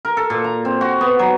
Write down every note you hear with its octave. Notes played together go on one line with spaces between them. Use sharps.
A#4
A4
A#2
A#5
C4
F#4
B3
F#3